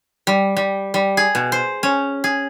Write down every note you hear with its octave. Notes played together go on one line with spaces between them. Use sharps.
G3
G3
G3
G#4
B2
C5
C#4
G#4